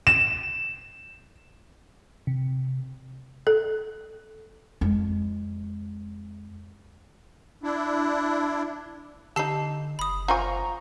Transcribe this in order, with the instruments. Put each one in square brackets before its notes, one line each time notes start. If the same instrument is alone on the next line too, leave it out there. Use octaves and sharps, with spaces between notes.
[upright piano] E7
[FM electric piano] C3
[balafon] A4
[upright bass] F2 G#3
[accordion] D4 E4
[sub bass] D3 [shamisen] D#4 A4 [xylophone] G4 C7
[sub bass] F#1 [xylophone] B5 D#6
[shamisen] F4 C5 G#5 [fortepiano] A#5 C#6